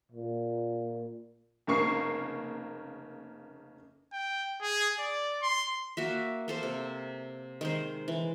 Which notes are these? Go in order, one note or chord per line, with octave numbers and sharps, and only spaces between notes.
A#2
F1 C#3 A#3 C#6 C7
G5
G#4
D5
C6
A#3 F#4 E5
A#3 A4 C5
C3
D#3 G#3 C5
E3